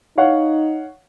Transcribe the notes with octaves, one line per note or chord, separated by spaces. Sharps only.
D#4 C#5 F5 F#5